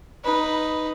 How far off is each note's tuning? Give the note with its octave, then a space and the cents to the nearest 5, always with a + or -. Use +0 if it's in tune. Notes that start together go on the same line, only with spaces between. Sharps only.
D#4 +0 B4 +0